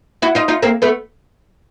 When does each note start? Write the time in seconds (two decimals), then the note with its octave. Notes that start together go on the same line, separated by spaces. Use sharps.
0.22 E4 F#4
0.35 D#4 F4
0.48 D#4 F4
0.62 A#3 C4
0.82 A3 B3